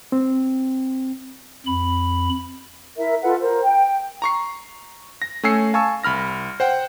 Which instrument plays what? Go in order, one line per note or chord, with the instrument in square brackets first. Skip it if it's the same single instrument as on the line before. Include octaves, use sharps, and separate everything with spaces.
[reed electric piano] C4
[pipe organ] F2 B5
[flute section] E4 A#4 E5
F4 A4 B4 F#5
A#4 C5
G5
[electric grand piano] A#5 C#6 C7
A#6
A3 C#4 G#5 E6 C7 C#7
F5 G#5 A5 C#6 E6
C2 B5 F6 A#6
C5 F#5 G5